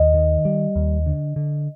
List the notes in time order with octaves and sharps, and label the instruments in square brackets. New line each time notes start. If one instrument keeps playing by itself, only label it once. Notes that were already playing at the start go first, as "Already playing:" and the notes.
Already playing: [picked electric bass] D#2 [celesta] D#5
[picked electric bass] D#3
G3
D#2
D3
D3